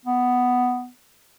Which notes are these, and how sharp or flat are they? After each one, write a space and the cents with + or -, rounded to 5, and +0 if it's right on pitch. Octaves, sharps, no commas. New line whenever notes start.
B3 +5